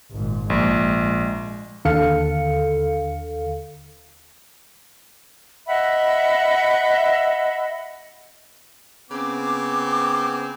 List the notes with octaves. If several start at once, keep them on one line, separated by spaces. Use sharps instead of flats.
G#1 A#2
A#1 G#3
D#2 D3 A4 F5 C#7
D#5 E5 F#5 B5
C#3 B3 C4 D6